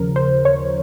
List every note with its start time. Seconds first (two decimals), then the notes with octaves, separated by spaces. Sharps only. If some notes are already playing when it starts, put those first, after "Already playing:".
Already playing: D#2 C#3 F3 A#4
0.16 C5
0.45 C#5